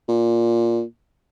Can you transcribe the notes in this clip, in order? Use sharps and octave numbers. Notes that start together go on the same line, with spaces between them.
A#2